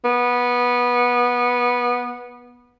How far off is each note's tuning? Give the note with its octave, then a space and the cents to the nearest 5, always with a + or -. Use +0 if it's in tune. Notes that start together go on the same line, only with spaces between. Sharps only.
B3 -15